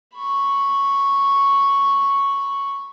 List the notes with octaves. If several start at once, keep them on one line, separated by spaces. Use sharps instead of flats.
B5 C#6